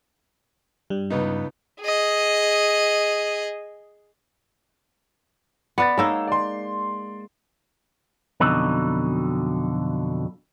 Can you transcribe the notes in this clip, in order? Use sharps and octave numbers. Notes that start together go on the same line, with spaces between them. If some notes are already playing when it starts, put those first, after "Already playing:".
G2 G3
C#2 B3 D#4
G#4 D#5
B3 B4 D5 A6
G#3 A#3 D#4 C#5 E6
D5 C6
F2 B2 D3 F#3 D#4